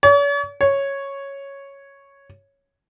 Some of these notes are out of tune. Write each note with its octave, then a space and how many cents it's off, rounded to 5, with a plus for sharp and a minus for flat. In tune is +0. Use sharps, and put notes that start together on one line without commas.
C#5 +45
C#5 -5